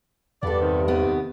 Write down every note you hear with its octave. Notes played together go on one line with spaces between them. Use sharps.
E2 G2 B3 A4 D5
C3 D#3
D#2 B3 G4